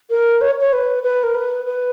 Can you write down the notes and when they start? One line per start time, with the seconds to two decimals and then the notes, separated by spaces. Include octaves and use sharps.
0.10 A#4
0.41 C#5
0.61 C#5
0.73 B4
1.03 B4
1.23 A#4
1.35 B4
1.66 B4